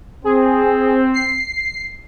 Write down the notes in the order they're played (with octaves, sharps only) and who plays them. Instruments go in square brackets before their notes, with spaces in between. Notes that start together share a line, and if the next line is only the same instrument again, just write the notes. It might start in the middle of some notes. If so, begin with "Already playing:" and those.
[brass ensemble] C4 [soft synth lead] G#4
[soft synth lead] C7